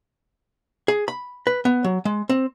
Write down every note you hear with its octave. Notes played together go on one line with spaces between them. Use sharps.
G#4
B5
B4
B3
F#3
G#3
C4